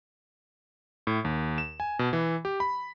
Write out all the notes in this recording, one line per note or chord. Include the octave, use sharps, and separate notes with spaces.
A2
D#2
E7
G#5
B2
E3
G4
B5